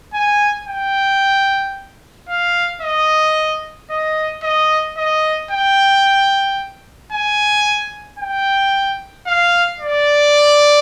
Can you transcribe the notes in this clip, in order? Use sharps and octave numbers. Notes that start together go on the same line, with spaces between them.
G#5
G5
F5
D#5
D#5
D#5
D#5
G5
G#5
G5
F5
D5